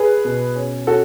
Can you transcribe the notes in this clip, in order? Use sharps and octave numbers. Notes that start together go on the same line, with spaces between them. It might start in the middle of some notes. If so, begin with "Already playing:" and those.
Already playing: G#4 B4
B2
C#4
C#4 F#4 A4